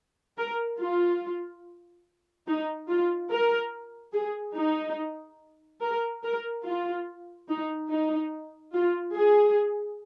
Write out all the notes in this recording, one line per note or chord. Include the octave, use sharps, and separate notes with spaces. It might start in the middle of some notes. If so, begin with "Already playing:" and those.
A#4
F4
D#4
F4
A#4
G#4
D#4
A#4
A#4
F4
D#4
D#4
F4
G#4